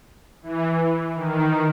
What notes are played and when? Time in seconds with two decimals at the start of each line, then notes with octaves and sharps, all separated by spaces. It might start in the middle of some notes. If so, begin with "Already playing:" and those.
0.43 E3
1.15 D#3